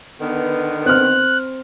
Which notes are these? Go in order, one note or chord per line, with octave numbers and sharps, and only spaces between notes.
D3 D#3 B3
C4 F6 F#6